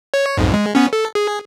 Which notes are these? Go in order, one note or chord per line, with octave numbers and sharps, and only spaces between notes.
C#5
B1 F2 G#2
G#3
B3 C#4
A4
G#4